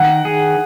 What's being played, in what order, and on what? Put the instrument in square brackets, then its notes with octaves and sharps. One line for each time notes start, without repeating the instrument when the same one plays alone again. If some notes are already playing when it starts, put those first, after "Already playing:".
Already playing: [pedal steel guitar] D#3 [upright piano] F#5
[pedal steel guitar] G#4